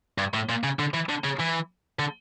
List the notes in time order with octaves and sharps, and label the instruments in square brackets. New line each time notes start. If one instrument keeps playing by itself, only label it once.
[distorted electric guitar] G2
A2
A#2
C#3
D3
E3
D3
C#3
E3
D3